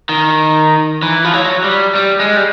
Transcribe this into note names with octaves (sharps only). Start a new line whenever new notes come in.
D#3
E3
F3
F#3
G3
G3
G#3
G3